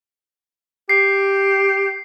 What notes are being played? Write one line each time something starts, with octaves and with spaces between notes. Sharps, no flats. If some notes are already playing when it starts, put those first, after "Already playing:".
G4 C7